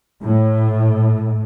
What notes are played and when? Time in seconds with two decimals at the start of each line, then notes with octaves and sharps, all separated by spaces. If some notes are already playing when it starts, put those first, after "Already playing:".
0.21 A2